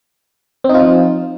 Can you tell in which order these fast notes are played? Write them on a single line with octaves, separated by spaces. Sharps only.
C4 D#4 F4 F3